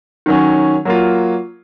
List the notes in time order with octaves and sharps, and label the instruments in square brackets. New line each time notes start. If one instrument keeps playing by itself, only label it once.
[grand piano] D#3 F#3 C#4
F#3 A#3 F4